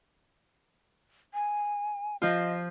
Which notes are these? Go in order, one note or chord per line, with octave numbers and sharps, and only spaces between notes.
G#5
F3 F4 D#5